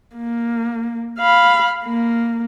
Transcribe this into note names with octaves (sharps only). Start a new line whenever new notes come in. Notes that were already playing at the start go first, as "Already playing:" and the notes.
A#3
F5 B5
A#3